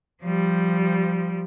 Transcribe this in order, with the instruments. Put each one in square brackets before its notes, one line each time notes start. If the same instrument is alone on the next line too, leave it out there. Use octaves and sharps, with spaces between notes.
[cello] F3 G3